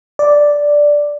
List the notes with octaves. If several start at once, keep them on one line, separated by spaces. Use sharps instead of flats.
D5